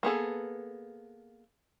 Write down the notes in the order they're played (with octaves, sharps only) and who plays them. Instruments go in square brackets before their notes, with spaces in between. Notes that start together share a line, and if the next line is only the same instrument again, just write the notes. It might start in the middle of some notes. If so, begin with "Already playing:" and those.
[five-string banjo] A#3 B3 G#4 A4